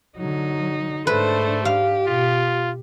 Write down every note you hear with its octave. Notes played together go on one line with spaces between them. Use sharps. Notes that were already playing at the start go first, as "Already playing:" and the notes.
D3 F#3 D#4
G#2 A3 D4 A4 B4 C5
G4 F5
B2 F4